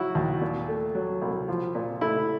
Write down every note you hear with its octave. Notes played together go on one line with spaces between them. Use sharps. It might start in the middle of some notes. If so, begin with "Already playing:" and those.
Already playing: F#3 E4 F#4
D#2
A#2
A3
F#3
C2
F3
A#2
A3 E4